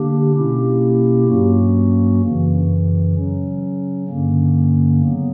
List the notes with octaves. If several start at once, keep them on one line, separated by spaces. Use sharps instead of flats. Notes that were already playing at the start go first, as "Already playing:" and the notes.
Already playing: D3 A#3 D4 G4
B2 A#3 C#4 E4 G4
G2 F#3 A#3 C#4 F#4
F#2 C#3 E3
C#3 F#3 C#4
G2 D3 A#3 C#4
C#3 F#3 B3